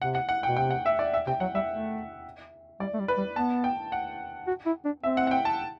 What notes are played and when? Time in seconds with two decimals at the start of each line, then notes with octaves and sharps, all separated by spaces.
0.01 C3 F#5
0.15 F#5
0.29 F#5
0.43 G5
0.48 B2
0.56 C3 G5
0.70 F#5
0.86 E5
0.99 D5
1.13 E5
1.27 C3 G5
1.40 F#3 F#5
1.54 G3 E5
1.69 A3
2.80 G3 D5
2.94 A3
2.99 G3
3.08 B4
3.17 G3
3.36 B3 A5
3.64 G5
3.92 F#5
4.47 F#4
4.66 E4
4.85 D4
5.03 C4 E5
5.17 F#5
5.27 F#5
5.31 G5
5.45 A5